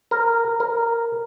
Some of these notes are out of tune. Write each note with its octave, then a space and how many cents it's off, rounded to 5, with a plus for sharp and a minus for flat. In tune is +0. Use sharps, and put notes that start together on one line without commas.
A#4 -10
A#4 -5